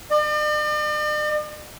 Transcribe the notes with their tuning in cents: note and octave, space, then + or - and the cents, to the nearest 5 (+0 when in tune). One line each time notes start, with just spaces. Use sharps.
D5 +45